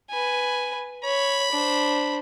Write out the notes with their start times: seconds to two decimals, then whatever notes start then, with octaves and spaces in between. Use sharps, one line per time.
0.11 B4 G#5
1.04 C#5 B5
1.52 D4 C5